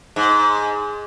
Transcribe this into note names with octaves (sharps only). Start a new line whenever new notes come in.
G#2